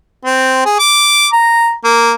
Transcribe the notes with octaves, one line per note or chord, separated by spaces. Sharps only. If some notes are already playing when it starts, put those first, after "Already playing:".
C4
G#4
D6
A#5
A#3